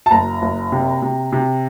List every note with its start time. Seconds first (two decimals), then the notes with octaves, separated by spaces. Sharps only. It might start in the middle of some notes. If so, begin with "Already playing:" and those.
0.06 A5
0.11 F#1 A#5
0.42 F#1
0.72 C3
1.02 C3
1.32 C3